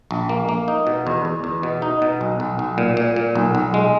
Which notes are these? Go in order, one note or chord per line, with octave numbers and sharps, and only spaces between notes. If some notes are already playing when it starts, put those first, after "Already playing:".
A#1
A#3
A#3
D#4
B2
E2
E2
E2
B2
D#4
B2
B1
B1
B1
A#2
A#2
A#2
B1
B1
G#3